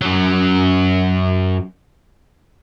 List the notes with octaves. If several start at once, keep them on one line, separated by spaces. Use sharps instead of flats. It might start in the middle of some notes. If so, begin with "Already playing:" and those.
F#2 F#3